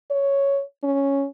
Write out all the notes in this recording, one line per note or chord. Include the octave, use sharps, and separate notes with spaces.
C#5
C#4